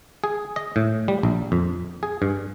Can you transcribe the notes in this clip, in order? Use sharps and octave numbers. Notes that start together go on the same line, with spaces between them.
G#4
D#5
A2
G3
A#1
F2
G#4
G2